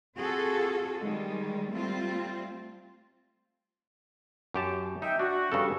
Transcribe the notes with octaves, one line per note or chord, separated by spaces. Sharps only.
C4 F4 F#4 G#4 A4
D#3 G3 G#3
G3 A3 C4 F4
F#2 G4 A5
D#4 E5 G5
D4 F#4
G2 C#3 A4